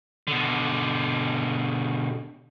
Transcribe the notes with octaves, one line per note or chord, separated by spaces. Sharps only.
B2 D3